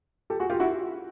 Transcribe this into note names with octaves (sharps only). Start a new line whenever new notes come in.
G4 A4
F#4 G#4
F4 G4
E4 F#4